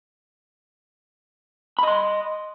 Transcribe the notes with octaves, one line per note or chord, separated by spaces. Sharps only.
D#5 B5 C6